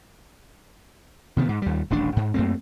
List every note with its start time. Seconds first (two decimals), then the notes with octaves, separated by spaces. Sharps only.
1.37 C3 D#3 G#3 B3
1.49 G#2
1.62 D#2 G3
1.90 D#1 A1 D4
2.16 G#2
2.34 F#2 A3 A#3 C4